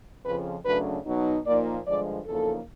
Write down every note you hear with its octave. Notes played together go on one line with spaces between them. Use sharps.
F2 C#3 F3 B4
F#2 C#3 F#3 A3 D4 B4
B2 F#3 B3 D#4
A#2 F3 A#3 D#4 D5
G2 D3 F3 G#3 D5
E2 C#3 F3 A#3 D#4 A4